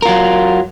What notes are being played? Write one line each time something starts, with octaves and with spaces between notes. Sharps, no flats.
F#3 F4 A#4